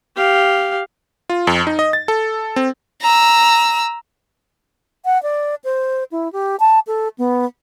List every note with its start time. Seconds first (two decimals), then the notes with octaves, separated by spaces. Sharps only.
0.16 G4 F5
1.30 F4
1.47 F2
1.67 D#4
1.79 D#5
1.93 A6
2.08 A4
2.56 C4
3.02 A#5 E6
5.05 F#5
5.23 D5
5.64 C5
6.12 E4
6.32 G4
6.60 A5
6.87 A4
7.18 B3